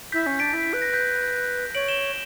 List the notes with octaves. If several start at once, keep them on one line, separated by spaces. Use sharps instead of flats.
E4 G6 B6
C#4
D4 B6 D7
E4
B4
A#6
G6 B6
C#5 D7 F#7
E7 G7